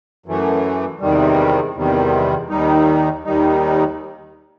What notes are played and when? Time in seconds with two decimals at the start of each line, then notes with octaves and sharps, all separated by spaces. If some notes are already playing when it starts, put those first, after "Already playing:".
0.26 F#2 E3 A3
1.00 E2 C3 D#3 G3
1.75 E2 C3 D#3 G3
2.49 D#2 D#3 G3 D#4
3.25 D#2 D#3 G3 D#4